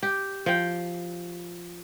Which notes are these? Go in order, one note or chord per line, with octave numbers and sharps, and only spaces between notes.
G4
F3 G5